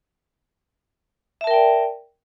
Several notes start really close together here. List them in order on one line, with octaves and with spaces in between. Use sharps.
E5 A5 A#4 G5 D5